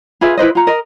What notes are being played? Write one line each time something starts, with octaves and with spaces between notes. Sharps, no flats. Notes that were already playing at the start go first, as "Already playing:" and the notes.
F4 G#4 B4 E5
E4 B4 C5 D#5
F4 A#5
A#4 D#5